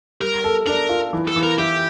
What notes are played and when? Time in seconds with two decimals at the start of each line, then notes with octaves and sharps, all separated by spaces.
0.20 G3 A#4
0.44 A4
0.66 D4 A#4
0.89 F4
1.13 E3
1.28 A4
1.36 E3
1.43 A#4
1.58 E4 G4